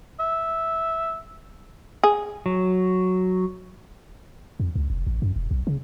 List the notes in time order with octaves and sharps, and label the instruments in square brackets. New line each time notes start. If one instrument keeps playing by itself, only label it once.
[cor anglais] E5
[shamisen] G#4
[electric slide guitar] F#3
[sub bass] F2
C#2
F1
A1
F#2
E1
B1
C#3